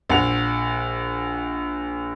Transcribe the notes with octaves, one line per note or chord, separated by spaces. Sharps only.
A#1 F#5 F7